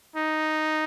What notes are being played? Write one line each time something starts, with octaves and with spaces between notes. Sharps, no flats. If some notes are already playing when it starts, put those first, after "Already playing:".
D#4